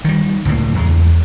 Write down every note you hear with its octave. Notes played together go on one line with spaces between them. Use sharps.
D#3 G3
C#2 A2 A#3
E2 G#3